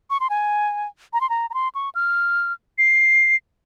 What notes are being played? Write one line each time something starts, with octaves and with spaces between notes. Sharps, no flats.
C#6
C6
G#5
A#5
C6
A#5
A#5
C6
C#6
F6
C7